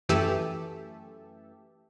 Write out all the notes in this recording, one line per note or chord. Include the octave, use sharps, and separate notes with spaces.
F#2 E3 A3 G4 A4 E5